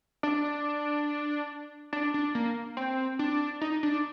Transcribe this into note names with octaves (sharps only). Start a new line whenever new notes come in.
D4
D4
D4
A#3
C4
D4
D#4
D4